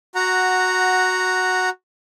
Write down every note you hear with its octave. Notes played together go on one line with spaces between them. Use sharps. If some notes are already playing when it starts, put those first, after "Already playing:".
F#4 F#5 A#5